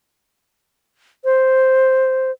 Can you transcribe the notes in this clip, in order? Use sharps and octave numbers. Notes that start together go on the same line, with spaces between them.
C5